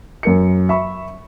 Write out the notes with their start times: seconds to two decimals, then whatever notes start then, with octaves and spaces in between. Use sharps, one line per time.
0.23 F#2 A#4 C#7
0.69 E5 B5 C#6